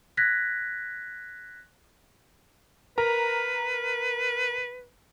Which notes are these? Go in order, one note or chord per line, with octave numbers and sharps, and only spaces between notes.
F#6 G#6 A#6 B6
A#4 B4 A#5